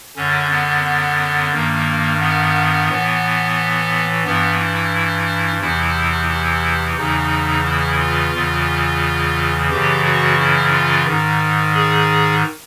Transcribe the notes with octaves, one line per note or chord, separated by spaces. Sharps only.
F#2 D3 C#4
B3
B3
G2 D#3 A#3
B3
A2 E3
G2 E3 B3
E4
E2 C3 E3 E4
E4
E2 C#3 E3 D#4
E4
F4
E2 C#3 E3
F#2 C#3 E3 G4
F#4
E4
F4
G#2 D#3
G#4